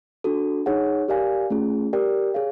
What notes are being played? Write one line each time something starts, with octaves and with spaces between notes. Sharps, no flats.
D4 F#4 A4
D#4 G#4 C#5 F#5
G4 A#4 D5 F5 G#5
A3 C#4 F4 G#4
G4 A#4 D5 G5
G#4 C#5 F5